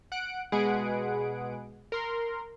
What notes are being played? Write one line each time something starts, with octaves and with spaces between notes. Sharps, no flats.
F#5 F#6 D7
B2 G#3 G#4 B4 F#5 D7
A#4 C6